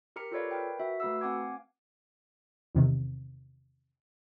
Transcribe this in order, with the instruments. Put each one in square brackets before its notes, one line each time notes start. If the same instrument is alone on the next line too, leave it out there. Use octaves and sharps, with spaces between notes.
[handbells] G4 A#4 A#5 C#7
F4 A4 B4 C#5 D5 F5
A#4 B4 G5
F#4 E5
A3 F#4 B4 F5 E6
C4 F5 F#5 G#5 D6 G#6
[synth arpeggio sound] E2 C3 D#3